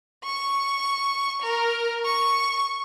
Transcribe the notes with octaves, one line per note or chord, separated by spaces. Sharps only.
C#6
A#4
C#6